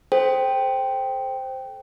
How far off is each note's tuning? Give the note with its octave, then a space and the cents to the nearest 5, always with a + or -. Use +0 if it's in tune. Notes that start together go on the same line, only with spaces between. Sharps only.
A4 -20 C5 +0 G5 +0